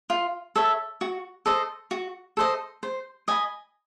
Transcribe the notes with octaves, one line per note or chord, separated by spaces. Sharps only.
F4
A4 C#5 E5
F#4
A4 C5 D#5
F#4
A4 C5 D#5
C5
D#5 G#5 B5